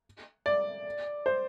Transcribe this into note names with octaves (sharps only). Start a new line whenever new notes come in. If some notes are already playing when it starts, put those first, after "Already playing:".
D5
C5